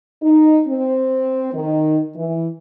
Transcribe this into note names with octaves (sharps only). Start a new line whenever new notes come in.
D#4
C4
D#3
E3